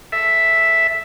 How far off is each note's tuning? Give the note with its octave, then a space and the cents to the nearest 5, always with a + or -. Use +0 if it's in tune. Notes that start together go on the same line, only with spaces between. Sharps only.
A4 +0 E5 +0